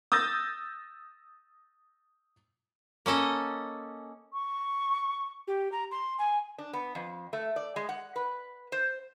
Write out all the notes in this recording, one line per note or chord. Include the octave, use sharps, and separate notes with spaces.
D#6 E6 G6 A6 A#6
A#3 C#4 A4 D#5
C#6
G4
A#5
C6
G#5
D4
B3
F2
A3
D5
G#3
F#5
B4
C5